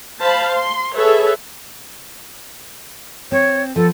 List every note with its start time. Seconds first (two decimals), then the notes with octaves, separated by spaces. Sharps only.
0.20 C5 F5 A5 B5
0.51 C6
0.95 G#4 A4 B4 C#5 E5
3.32 C4 C#5
3.76 F3 B3 A4